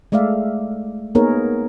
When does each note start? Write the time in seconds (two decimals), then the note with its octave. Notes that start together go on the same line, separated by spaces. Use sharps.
0.12 G#3 A3 D5 E5 F5
1.15 A#3 B3 D#4 G#4 A#4 C#5